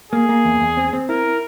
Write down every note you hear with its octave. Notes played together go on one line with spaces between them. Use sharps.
A#3 G#4
A#3
E2
E2
C4
C4
E4 A#4